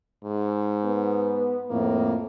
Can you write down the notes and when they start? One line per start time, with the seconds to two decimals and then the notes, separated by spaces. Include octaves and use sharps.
0.24 G#2
0.85 B3 B4
1.70 F2 A2 A#3